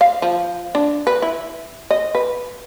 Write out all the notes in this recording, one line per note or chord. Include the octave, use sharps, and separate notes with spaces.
F5
F3
D4
B4
E4
D#5
B4